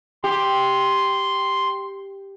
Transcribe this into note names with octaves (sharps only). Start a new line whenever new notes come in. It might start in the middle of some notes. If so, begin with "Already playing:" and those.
G4 C6